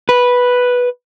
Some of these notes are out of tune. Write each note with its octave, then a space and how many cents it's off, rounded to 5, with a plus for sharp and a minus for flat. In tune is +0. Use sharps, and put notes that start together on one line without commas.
B4 -5